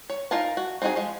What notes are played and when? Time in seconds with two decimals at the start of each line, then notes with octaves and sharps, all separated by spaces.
0.10 C#5
0.31 D#4 F4 A#4 G#5 A5
0.57 F#4
0.82 C4 D4 D#4 F#4 G#4
0.96 F3 G#3